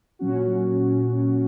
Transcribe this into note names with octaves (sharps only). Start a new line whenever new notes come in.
A#2 F#3 C#4 F#4